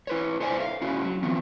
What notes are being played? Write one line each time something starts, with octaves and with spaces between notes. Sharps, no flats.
E4 B4 C#5
A4 C5 D5 E5 G5 G#5
F5
A3 C#4 E4 F#4
F#3
E3 B3 C4